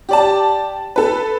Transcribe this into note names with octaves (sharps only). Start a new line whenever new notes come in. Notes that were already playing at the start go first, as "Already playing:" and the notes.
G4 D5 A5
A4 B4